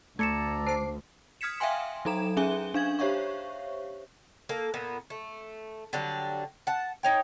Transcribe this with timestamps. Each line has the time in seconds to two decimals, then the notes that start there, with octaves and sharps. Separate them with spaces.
0.19 D2 A3 A4 D5 A#5 G#6 C#7 E7
0.67 C5 A5 D6 C7
1.41 D#6 F6 G#6 B6 C#7 E7
1.60 E5 F5 G5 G#5 C6
2.05 F#3 D#4 A4 A#5 E7
2.37 C#4 G#4 E5 G#5 G7
2.74 D4 F5 G#6 F#7
2.99 G4 C5 C#5 E5 F5 C#6
4.49 A#3 A4
4.74 A#2 B3
5.10 A3
5.93 D3 F#3 G3 D4
6.67 F#5 A5
7.03 D#4 C#5 G5